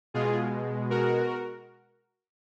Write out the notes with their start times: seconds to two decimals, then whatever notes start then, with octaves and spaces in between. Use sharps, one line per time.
0.14 B2 G#3 F4 G#4
0.90 F#4 A#4